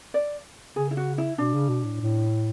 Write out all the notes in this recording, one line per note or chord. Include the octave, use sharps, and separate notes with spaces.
D5
C#3 G#4
E4
F#4
E4
B2 D4
C#3
B2
A2
A2